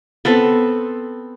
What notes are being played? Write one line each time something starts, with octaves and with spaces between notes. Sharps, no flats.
B3 C4 A4